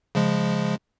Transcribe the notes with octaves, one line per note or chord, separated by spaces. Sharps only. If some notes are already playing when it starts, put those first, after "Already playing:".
C#3 F3 G#3